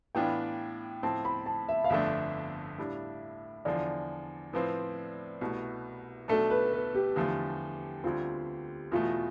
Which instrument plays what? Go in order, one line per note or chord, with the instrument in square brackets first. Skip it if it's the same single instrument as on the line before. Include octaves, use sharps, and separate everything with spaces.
[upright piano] A2 E3 B3 D4 F4 [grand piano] G5
[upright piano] A2 F3 C4 [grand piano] A5
[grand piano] B5
A5
E5
F5
[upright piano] G1 F2 D3 A3 D4 [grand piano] E5
[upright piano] A2 G3 D4
[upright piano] E2 D3 F3 [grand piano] D5
[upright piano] A2 F3 C4 [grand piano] B4
[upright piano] C2 B2 A3
[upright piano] B1 B2 A3 D4 [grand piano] A4
[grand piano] B4
B4
G4
[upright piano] E2 D3 F3 A3
[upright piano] D2 D3 G3 C4 [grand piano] F4
[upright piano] E2 B2 A3 [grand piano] F4